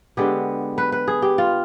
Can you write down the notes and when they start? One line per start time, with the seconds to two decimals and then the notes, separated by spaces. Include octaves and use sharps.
0.17 D3 G#3 B3 G4
0.78 B4
0.92 B4
1.08 G#4
1.22 G4
1.38 F4